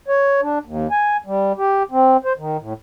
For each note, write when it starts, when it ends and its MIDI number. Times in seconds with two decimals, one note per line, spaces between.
0.08 0.41 73
0.42 0.59 62
0.65 0.87 39
0.91 1.17 80
1.26 1.52 55
1.58 1.83 67
1.91 2.17 60
2.24 2.33 72
2.38 2.57 51
2.60 2.73 45